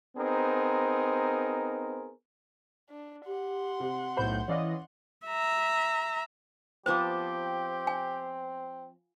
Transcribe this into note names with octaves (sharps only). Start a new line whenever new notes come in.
B3 C4 D#4 G#4 A#4 C5
D4
G4 F#5 C6
C3
B1 A2 C5 B5 G6
E3 C#4 D5 D#5 F5
E5 A#5
F3 B3 C4 G4 C5 A5 D6
G#5